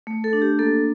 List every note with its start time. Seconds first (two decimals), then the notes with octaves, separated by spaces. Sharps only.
0.07 A3
0.24 A4
0.33 D4
0.42 G4
0.59 A#3 A4